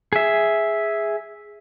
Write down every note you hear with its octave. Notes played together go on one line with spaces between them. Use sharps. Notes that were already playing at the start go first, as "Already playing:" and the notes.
G#4 E5